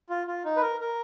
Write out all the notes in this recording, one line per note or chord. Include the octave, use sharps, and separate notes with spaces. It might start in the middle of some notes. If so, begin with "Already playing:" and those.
F4
F4
D#4
B4
A#4
A#4